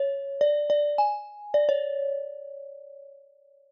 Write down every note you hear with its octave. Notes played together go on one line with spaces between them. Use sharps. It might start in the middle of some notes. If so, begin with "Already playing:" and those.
Already playing: C#5
D5
D5
G#5
D5
C#5